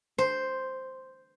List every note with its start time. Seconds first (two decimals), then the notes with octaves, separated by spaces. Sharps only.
0.18 C5